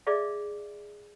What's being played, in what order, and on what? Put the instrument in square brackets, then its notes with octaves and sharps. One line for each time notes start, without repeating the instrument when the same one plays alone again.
[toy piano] G#4 D5 E5 F5